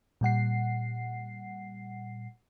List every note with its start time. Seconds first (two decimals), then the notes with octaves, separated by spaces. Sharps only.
0.21 A#2 G3 F#5 C7